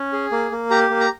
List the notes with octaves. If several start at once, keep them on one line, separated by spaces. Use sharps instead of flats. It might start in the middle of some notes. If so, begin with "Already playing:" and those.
Already playing: C#4
G#4
A#3
A#3
G4 A#5
A#3
A#5